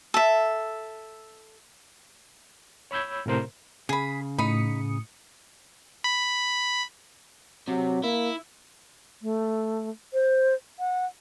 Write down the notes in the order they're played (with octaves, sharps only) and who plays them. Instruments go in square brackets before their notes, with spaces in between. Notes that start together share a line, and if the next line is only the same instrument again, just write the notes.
[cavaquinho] A4 E5
[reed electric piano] C#5 B5 E6 G6 G#6
A2 C3 A#4 C5
[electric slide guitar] C#3 [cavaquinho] G#4 B5
[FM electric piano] A2 D#6 C#7 [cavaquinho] D#4 B5
[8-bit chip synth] B5
[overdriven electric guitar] C3 [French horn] F#3
[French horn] A#3 [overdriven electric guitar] E4
[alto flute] A3
C5
F#5